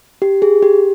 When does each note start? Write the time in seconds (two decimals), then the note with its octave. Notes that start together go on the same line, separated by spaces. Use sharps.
0.22 G4
0.42 G#4
0.63 G4